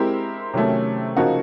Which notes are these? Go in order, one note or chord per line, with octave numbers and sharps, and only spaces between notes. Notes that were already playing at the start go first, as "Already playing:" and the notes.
Already playing: G#3 C4 E4 G4 A#4
C3 D#3 F#3 A3 C#4
C#3 F3 A#3 D#4 F#4